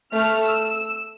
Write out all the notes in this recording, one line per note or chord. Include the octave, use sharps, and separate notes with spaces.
A3 F6
E6